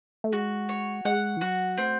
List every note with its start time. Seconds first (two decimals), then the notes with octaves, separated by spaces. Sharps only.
0.24 A3
0.33 G#3 F#4
0.69 C#5
1.05 G#3 F#5
1.37 E3
1.41 F#3 F#4
1.78 A3 C4